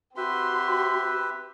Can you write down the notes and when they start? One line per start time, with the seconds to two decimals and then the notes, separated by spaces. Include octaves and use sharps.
0.17 C4 F#4 G4 B4 E5 C6